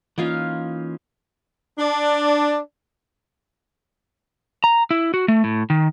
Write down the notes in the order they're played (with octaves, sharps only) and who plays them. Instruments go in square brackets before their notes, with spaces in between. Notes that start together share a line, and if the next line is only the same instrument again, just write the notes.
[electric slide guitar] E3 A#3 C#4 [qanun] D#4 F4 F5
[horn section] D4
[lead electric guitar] A#5
E4
F#4
A3
A2
D#3